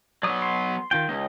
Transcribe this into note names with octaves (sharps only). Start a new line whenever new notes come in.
F#3 B3 D5 D#6
C6
D#3 F4 G5
C#2 D#5